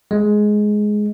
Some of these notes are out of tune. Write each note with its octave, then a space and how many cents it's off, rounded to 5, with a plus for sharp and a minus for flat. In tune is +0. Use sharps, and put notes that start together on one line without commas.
G#3 +10